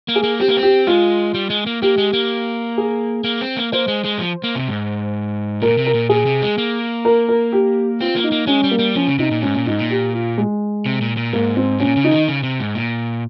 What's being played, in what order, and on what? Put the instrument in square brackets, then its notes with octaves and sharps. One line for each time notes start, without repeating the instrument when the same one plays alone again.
[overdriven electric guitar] A#3
[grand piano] G#4
[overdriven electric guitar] A#3
[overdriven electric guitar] C4 [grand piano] G4
[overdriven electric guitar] A#3
C4
[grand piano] G4
[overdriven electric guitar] G#3 [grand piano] F4
[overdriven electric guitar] G3
G#3
A#3
[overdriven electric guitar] A#3 [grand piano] G4
[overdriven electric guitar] G#3
A#3
[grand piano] G#4
[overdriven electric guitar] A#3
C4
A#3
[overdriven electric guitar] A#3 [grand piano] C5
[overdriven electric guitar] G#3
G#3
F3
A#3
C3
G#2
[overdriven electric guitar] A#2 [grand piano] A#4
[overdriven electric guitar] C3
[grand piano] A#4
[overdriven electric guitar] A#2
[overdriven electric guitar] A#2 [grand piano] G#4
[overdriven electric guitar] C3
G#3
A#3
[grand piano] A#4
A#4
G4
[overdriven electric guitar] C4 [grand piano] F4
[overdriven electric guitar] A#3
[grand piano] D#4
[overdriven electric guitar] A#3
[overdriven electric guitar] G#3 [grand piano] C#4
[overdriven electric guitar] G3
[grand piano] A#3
[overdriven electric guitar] G3
[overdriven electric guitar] F3 [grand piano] C#4
[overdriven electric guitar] C#3
[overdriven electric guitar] C3 [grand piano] D#4
[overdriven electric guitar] A#2
[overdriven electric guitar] G#2 [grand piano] C#4
[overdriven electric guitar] A#2
[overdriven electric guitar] G#2 [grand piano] D#4
[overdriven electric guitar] A#2
[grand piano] G4
F4
G#3
[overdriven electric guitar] C3
A#2
A#2
[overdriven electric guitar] G#2 [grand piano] A#3
[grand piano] C4
[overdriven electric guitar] A#2 [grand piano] C#4
[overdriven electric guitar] C#3
[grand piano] D#4
[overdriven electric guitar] D#3
C#3
C3
G#2
A#2